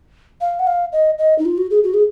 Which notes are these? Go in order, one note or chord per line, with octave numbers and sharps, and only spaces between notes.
F5
F#5
F5
D#5
D#5
D#4
F4
F#4
G#4
F#4
G#4